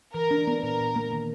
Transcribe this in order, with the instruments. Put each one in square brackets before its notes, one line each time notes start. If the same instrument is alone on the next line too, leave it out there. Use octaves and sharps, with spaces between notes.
[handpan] E3 [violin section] A#4
[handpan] D4
B3
[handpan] A#2 [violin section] A#4
[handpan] A#2
A#3
D#3